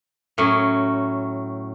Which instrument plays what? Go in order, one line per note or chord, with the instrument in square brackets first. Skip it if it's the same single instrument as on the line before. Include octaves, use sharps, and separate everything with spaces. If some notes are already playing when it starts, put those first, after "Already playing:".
[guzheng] A2 F#3 C#4